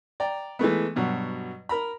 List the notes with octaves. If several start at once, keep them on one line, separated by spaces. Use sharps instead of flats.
D5 G5 A#5
E3 G#3 A3 B3
G2 B2 F#3
A#4 A#5 B5